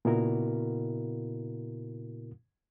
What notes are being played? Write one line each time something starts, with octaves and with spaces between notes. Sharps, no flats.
A#2 C#3 B3 E4 F#4 A#4